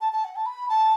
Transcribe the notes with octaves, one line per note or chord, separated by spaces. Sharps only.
A5
A5
F#5
A5
B5
A5